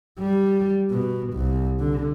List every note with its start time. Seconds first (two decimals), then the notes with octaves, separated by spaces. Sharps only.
0.19 G3
0.90 B2
1.33 C2
1.79 D3